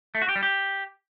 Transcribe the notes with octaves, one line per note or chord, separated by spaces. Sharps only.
A3
F#4
G4
G3
G4